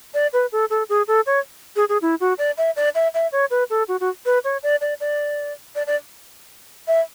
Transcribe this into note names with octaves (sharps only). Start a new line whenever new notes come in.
D5
B4
A4
A4
G#4
A4
C#5
G#4
G#4
E4
F#4
D5
E5
D5
E5
E5
C#5
B4
A4
F#4
F#4
B4
C#5
D5
D5
D5
D5
D5
E5